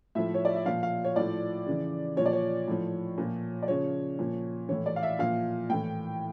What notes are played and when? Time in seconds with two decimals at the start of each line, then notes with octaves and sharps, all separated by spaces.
0.15 A2 F3 E5
0.34 C#5
0.45 D5
0.55 E5
0.66 A#2 F3 F5
0.83 F5
1.05 C#5
1.16 A2 F3 D5
1.66 C#3 E3
2.17 A#2 F3 C#5
2.26 D5
2.33 C#5
2.67 A2 F3
3.18 A#2 F3
3.63 D5
3.68 C#3 F3 C#5
4.19 A#2 F3
4.69 A2 E3 C#5
4.86 D5
4.96 F5
5.03 E5
5.19 A#2 F3 F5
5.70 A2 E3 G5